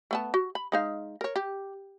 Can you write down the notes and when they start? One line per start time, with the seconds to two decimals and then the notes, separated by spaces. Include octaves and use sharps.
0.11 A3 B3 A5
0.34 F#4
0.55 B5
0.72 G#3 D#4 F5
1.21 A#4 C#5
1.36 G4